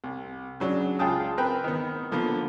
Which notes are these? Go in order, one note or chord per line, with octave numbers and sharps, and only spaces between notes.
C2
C#3 F#3 D4
C#2 F4 G#4 G5 A5 D#6
C4 A#4 B4 G5
D#3 B3
D3 F3 A#3 B3